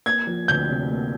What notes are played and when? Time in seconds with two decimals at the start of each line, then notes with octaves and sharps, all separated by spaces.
0.06 A#3 G#6
0.27 F3
0.48 D2 G6
0.70 C3
0.91 A#3